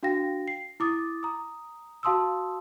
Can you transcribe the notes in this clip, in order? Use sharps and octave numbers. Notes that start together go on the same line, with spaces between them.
D4 F#4 F5 G5 A#6
C7
E4 D6 D#6 A6
A#5 D#6
F#4 F5 A5 C6 D#6 E6